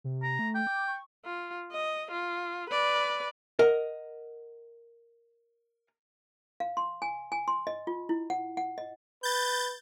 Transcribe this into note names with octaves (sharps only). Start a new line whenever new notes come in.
C3
A#5
A3
G5
D6
C#6
F4
D#5
F4
B4 D5
A#4 D#5 F#5
F5
C6
G#5
G#5
C6
D#5
F4
E4
F#5
F#5
D#5
B4 G6 A6